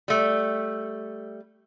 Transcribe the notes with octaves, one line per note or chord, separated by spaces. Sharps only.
G3 A3